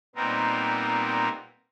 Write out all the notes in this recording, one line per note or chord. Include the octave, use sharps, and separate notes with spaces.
A#2 G3 B3 C4 D#4 A#4